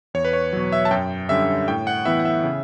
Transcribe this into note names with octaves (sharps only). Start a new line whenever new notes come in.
E2 C#5
B4
C#5
B2 F#3
E5
A5
F#2 G5
D3 G3 C#4 E5
A2 G5
F#5
E3 B3 E4 E5
F#5
E5
C#3